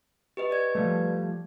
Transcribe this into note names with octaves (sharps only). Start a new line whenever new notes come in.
G4 B4 D#5
B4 D5 G#6
F3 G3 A3